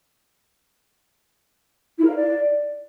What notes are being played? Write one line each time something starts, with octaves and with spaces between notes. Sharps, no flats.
E4
A#4
F5
D5